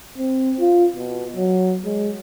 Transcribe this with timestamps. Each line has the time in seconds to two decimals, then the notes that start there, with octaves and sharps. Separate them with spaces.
0.18 C4
0.60 F4
0.96 B2
1.36 F#3
1.85 G#3